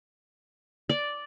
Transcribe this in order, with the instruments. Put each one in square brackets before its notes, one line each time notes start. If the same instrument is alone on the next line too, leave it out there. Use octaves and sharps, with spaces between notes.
[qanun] D5